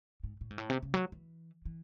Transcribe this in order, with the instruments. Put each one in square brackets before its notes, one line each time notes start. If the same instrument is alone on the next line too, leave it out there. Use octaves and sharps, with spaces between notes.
[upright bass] G#2
A2
G#2
A2
C3
C#3
F#3
E3
E3